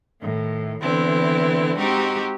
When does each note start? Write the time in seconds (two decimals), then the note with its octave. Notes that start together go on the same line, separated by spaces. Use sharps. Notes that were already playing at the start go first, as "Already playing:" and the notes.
0.20 A2 D#3
0.81 D3 E3 B3 C4 E4
1.77 G#3 C4 D#4 F#4 G4